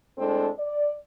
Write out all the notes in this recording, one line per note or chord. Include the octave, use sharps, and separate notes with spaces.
A2 G#3 C4 D4 A4
D5